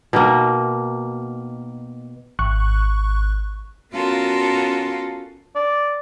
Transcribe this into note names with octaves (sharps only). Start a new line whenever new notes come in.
B2 D#3 A#3
G#1 C#6 F#6
B3 C#4 F4 F#4 A4 A#4
D5